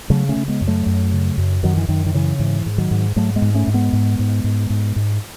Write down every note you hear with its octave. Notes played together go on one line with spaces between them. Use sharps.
C#3 F#3 A3
A3 C#4
C#3
G#3 B3
F#2
F#3 A3
F#2
C#3
F#2
F#2 D#3 F#3
E3
F#2 D#3
D#3
C#3 E3
G#2 E3
G#2
D#3 F#3
G#2
G#2 F#3 A3
G#3 B3
G#2
A3 C#4
G#2
G#3 B3
G#2
G#2
G#2
G#2
G#2